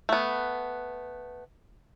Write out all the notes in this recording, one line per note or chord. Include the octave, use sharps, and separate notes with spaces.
A3 B3